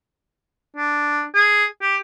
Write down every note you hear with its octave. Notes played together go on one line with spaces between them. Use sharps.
D4
G#4
G4